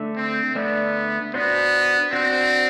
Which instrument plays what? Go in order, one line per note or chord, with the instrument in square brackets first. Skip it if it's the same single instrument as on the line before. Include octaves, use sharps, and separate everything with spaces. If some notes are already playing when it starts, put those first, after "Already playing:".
Already playing: [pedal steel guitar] D3 A3 D4 A4 E5
[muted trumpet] C4
[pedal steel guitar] D3 A3 D4 A4 E5 [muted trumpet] B3
[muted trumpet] B3 [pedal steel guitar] D4 F#4 C5
[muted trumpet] C4 [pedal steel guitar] D4 F#4 C5